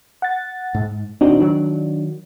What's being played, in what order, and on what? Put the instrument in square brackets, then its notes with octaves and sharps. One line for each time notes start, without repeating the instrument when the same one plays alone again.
[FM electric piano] F#5 A6
[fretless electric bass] G#2
[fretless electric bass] D#1 G#1 C4 [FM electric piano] D4 D#4 F#4
[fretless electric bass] D#3 F#3 [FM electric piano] D4